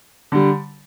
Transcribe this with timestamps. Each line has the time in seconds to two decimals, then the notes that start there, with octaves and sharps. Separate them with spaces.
0.32 D3 G3